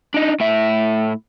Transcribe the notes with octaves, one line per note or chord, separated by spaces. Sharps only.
D4 D#4
A2 E5